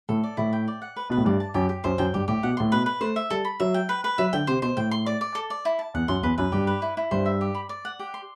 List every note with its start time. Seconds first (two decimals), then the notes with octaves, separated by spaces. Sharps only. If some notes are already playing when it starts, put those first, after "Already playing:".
0.09 A2 A4
0.23 D5
0.37 A2 E4
0.53 G5
0.68 D5
0.82 F#5
0.96 B4
1.10 B2 B4
1.17 A2
1.25 G2 D5
1.40 A5
1.54 F#2 G4
1.69 G4
1.84 F#2 C5
1.98 F#2 G5
2.14 G2 G4
2.28 A2 G4
2.43 B2 F#5
2.57 A2 C6
2.72 B2 B4
2.86 B4
3.01 A3 C5
3.16 E5
3.30 G3 A4
3.45 B5
3.60 F#3 E5
3.74 G5
3.89 B4
4.04 B4
4.18 F#3 E5
4.33 D3 G5
4.47 C3 C5
4.62 B2 C5
4.77 A2 G5
4.91 C6
5.06 D5
5.21 D5
5.35 A4
5.50 D5
5.65 E4
5.79 A5
5.94 E2 F#5
6.08 F#2 C6
6.23 E2 B4
6.38 F#2 B4
6.52 G2 G4
6.67 B4
6.82 E4
6.97 E4
7.11 G2 C5
7.26 E5
7.41 G4
7.55 B5
7.69 D5
7.85 F#5
7.99 G4
8.14 C6